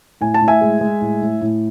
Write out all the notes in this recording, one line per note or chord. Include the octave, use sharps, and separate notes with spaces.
A2 G#5
A5
A2
E5 G#5
G#3
G#3
A2
A2
A2